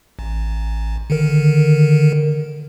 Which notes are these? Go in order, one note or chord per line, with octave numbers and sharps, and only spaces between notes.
A1
D3 D#3 A#4